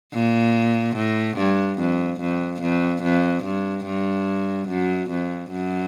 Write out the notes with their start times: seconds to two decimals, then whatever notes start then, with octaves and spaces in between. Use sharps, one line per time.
0.14 A#2
0.96 A2
1.38 G2
1.79 F2
2.21 F2
2.62 F2
3.03 F2
3.44 G2
3.86 G2
4.69 F#2
5.10 F2
5.52 F#2